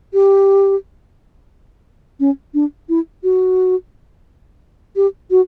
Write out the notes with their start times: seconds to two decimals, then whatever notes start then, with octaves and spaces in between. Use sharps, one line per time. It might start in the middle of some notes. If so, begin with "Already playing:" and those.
0.13 G4
2.20 C#4
2.54 D4
2.89 E4
3.24 F#4
4.96 G4
5.31 F#4